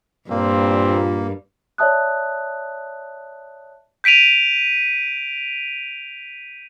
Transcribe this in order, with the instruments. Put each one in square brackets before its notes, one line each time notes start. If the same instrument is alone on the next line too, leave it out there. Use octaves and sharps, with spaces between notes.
[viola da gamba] G2 [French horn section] A#2 [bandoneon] A#3 [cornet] C4
[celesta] C#5 D5 E5 A5 D#6 F#6
[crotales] G6 B6 D7 D#7 F7